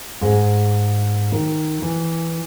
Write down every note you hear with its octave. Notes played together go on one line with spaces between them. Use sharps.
G#2
D#3
E3